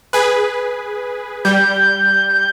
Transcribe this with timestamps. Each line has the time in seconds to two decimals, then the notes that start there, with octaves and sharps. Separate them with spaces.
0.13 G#4 B4
1.45 G3 G6